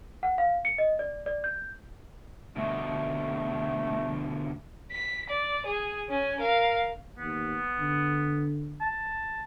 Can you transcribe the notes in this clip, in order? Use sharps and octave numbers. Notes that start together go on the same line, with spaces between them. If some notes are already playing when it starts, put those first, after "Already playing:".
F#5
F5
C#7
D#5
D5
D5
G6
D2 B2 A3
B6
D5
G#4
C#4 G#5
A#4 F5
D#2 B3
D3
A5